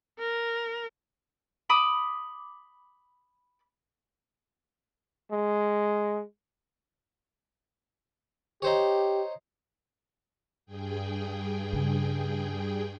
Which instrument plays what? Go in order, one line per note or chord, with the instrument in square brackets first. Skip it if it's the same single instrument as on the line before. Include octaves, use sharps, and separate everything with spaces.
[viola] A#4
[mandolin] B5 D6 D#6
[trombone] G#3
[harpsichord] D#4 C5 C#5 [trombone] G4
[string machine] G2 G#4 G5
[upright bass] C#3